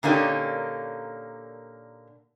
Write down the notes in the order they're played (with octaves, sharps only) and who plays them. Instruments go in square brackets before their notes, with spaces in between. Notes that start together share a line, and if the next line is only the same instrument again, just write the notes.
[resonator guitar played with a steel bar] A#2 D3 A#3 C#4 D#4 G4